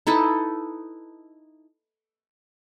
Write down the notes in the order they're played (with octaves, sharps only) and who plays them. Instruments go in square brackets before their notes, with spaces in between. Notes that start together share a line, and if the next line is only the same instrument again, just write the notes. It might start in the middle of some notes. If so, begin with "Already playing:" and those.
[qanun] D#4 E4 A4 B4